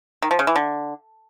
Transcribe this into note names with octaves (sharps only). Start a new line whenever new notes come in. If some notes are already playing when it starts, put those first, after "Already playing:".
D#3
F3
C#3
E3
D3